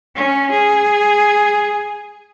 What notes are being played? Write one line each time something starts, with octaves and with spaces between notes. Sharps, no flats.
C#4
G#4